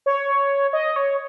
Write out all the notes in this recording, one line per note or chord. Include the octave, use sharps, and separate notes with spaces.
C#5
D#5
C#5